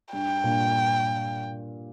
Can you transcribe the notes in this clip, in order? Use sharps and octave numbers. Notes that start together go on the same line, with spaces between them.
G2 G5
G2 A#2